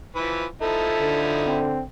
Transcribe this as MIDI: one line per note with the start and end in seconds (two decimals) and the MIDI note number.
0.16 0.45 52
0.16 0.45 53
0.16 0.45 71
0.62 1.67 53
0.62 1.67 63
0.62 1.67 64
0.62 1.21 69
1.01 1.83 50
1.47 1.83 60